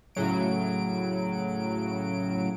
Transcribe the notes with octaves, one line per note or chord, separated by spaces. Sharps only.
A2 C#3 F#3 D7